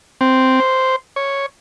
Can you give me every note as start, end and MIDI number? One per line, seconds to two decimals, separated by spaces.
0.21 0.60 60
0.60 0.96 72
1.16 1.46 73